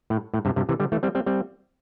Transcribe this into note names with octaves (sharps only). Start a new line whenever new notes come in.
A2
A2
G2 C3
G2 C3
C3 E3
D3 G3
E3 A3
G3 C4
G3 C4
G3 C4